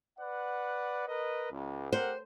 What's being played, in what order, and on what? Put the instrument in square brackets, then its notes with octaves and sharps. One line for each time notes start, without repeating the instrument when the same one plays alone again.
[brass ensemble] B4 D5 F#5
A#4 B4 D#5
C#2
[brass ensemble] G4 A#4 F#5 [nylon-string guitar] C5